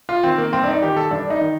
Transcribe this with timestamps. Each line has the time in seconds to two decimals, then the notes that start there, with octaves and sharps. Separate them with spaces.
0.09 F4
0.23 D#3 C4
0.38 A#3
0.52 G2 C4
0.64 D4
0.68 D#4
0.82 D#3 G4
0.97 A4
1.11 G2 D4
1.30 D#4
1.41 D#3